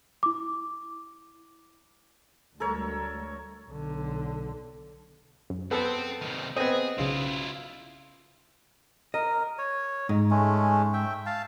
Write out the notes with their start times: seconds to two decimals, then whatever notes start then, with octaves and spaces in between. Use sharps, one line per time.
0.23 E4 D6
2.60 D2 G3 G#3 A4 A#4 C#5
3.69 B1 D3
5.50 F#2
5.71 B3 C4 A4 A5
6.21 C3 D#3
6.57 B3 C4 G#4 D#5
6.99 B1 C#3 E4 F4
9.14 A#4 D#5
9.58 C#5
10.09 G#2 D#4
10.31 G#3 A3 C#4
10.93 E5 G5
11.26 F5 A5